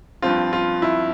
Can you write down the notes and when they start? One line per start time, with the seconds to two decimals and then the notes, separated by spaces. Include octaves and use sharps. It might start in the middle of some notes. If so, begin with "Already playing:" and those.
0.22 G2 F3 C4 F4
0.53 F4
0.82 E4